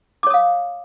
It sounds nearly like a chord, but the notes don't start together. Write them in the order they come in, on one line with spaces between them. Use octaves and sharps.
D6 C#5 D#6 F5